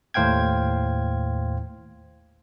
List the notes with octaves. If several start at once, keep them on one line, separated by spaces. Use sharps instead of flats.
D#2 A2 C5 F5 G5 G#6